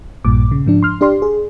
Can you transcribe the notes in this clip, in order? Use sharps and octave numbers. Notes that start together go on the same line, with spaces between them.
A#1 G2 A#2 D6
C#3
G#2 F3 D4
C6 F6
D4 G4 D5 C6
G#4